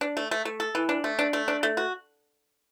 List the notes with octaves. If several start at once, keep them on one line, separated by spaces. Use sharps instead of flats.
D4
A3
A3
A3
A4
E3
D4
A3
D4
A3
D4
A3
F#4